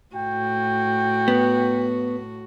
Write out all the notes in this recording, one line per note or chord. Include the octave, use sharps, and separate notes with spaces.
A2 F#4 G5
B3